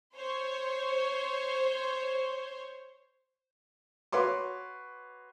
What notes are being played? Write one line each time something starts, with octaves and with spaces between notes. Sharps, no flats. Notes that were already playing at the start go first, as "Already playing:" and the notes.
C5 C#5
F#4 B4 C#5 C6 D6